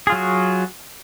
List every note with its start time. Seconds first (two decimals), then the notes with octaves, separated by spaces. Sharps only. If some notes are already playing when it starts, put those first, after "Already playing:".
0.07 G#4
0.10 F4
0.12 F#3
0.15 F#4